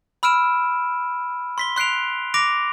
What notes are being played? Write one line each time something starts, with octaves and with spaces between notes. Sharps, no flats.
B5 E6 F6 D7 E7
C6 B6 G7
C6 F#6 C7 D7 F7
D6 A#6 D7 F7